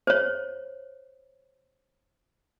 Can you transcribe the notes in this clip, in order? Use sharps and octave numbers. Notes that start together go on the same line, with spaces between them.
C5 C#5